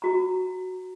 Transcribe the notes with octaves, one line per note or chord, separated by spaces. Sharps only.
F#4 A#5